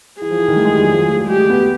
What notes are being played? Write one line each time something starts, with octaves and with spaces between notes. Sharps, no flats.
E3 G#4
F3
E3
D#3
A3
G#3
G3
F#3
F3
F#3
A3
G3
G#3 G4
A3
B3